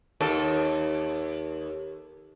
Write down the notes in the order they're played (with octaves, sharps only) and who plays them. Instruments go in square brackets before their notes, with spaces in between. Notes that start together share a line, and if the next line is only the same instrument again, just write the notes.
[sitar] D#2 A4